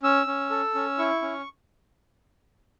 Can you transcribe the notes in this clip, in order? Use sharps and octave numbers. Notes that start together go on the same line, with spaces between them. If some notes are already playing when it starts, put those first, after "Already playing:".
C#4 E6
C#4
A4
C#4
E4 C#6
C#4